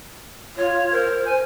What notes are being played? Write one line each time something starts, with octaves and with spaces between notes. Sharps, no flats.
F4 C#5
A#4 C5
G#5